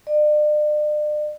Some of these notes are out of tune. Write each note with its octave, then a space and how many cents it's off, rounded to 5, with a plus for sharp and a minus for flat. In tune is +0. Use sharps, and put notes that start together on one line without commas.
D5 +40